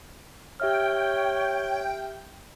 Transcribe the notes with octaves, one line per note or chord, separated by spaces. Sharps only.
G4 C#5 E5 G5 F6